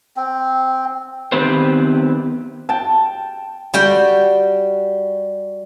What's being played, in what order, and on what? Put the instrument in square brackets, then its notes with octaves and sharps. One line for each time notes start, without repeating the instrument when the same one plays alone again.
[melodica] C4
[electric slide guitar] D#3 B3 C4 G4 B4 C5
[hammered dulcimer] G5 A5
[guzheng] G3 F#4 G5